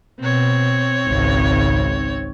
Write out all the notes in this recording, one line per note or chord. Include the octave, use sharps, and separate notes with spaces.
B2 C4 C#5
G#1 C#2